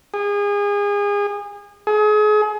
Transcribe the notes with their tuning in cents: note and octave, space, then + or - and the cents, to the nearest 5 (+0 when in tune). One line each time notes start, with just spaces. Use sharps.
G#4 -30
G#4 +35